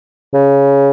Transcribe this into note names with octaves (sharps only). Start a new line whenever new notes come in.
C#3